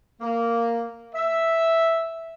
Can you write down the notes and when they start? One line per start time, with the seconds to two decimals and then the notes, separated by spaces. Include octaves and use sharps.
0.21 A#3
1.15 E5